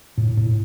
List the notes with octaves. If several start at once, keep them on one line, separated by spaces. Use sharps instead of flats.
A2
A2